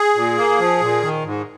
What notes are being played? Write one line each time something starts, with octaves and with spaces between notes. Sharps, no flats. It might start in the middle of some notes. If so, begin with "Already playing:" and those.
Already playing: G#4
A#2
A#3
F3
A#2
D#3
G#2